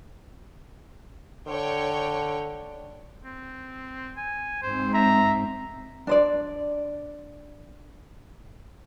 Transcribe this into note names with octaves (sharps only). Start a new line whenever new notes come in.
D3 C#5 G5
C4
G#5
G#2 C4 C5
E5 A#5
D4 C5 D5